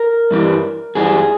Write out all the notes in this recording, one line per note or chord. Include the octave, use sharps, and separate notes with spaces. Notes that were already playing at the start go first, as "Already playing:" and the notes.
Already playing: A#4
G2 E3 G3
G2 E3 G3 G#4